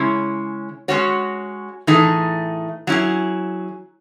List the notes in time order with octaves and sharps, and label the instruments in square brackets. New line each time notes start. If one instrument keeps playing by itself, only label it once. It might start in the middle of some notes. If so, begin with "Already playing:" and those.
Already playing: [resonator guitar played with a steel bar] C#3 G#3 C#4 E4
G#3 C#4 F#4 C#5
A2 E3 A3 D#4 G#4
F#3 C#4 E4 G#4